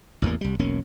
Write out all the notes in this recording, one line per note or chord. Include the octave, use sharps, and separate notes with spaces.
A1 E2 A2 A#3
C2 G3
E1 B1 A#3 C#4